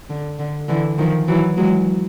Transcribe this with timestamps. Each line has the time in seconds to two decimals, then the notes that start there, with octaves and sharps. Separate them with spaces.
0.10 D3
0.39 D3
0.69 D3 E3
0.98 D#3 F3
1.28 E3 F#3
1.57 F#3 G#3